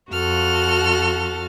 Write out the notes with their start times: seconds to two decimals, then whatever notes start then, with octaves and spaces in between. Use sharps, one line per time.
0.11 F2 F#4 A4 F6